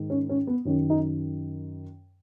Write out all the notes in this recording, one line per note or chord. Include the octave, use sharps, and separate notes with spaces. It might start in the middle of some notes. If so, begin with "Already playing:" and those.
Already playing: G#2 D#3
C#4
C#4
B3
F#2 D#3 C#4
D#4